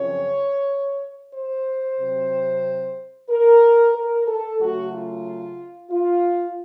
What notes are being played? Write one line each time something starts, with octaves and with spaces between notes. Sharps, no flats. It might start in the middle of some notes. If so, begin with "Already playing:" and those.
Already playing: F#2 C#3 F3 C4 C#5
C5
C3 F#3 C4
A#4
A#4
A4
C#3 F#3 A3 F#4
F4
F4